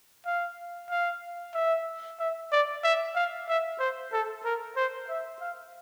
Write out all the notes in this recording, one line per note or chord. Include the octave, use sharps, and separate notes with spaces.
F5
F5
E5
E5
D5
E5
F5
E5
C5
A4
A#4
C5
E5
F5